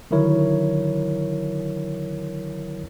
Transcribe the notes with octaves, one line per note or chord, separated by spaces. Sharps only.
D3 D#3 F#3 E4 A#4 C#5